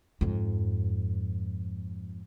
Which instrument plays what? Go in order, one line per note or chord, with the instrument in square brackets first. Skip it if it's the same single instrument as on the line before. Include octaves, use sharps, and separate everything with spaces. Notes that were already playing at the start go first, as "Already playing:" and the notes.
[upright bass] F2 G#2